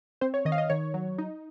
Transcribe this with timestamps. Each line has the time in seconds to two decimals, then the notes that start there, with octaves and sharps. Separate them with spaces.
0.21 C4 C5
0.34 C#5
0.45 D#3 D#5
0.52 F5
0.58 D#5
0.70 D#3 C#5
0.94 F#3
1.18 D#4